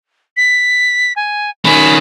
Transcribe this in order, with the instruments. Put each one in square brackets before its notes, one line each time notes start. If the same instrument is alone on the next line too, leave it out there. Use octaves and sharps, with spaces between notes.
[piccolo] B6
G#5
[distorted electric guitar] D#3 C#4 [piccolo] B5